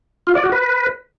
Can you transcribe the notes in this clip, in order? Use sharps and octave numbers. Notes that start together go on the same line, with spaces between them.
F4
D5
F#4
B4